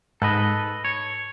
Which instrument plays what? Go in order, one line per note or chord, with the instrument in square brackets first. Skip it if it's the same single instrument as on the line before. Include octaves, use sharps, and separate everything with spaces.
[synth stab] G#2 [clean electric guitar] A4 B4 D#5
[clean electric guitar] C#5